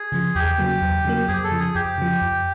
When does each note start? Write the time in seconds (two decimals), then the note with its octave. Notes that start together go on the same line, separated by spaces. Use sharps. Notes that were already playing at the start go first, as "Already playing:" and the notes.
Already playing: G#4
0.12 C#3 F3
0.35 E2 G4
0.58 C#3 F#3 A#3
0.82 E2
1.05 C#3 F#3 A#3
1.28 F2 G#4
1.44 A4
1.51 C#3 F3
1.59 G#4
1.75 F2 G4
1.98 C#3 F3
2.22 F2